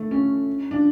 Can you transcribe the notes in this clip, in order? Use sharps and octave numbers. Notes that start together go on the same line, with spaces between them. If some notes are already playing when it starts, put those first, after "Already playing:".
Already playing: A3
C#4
D4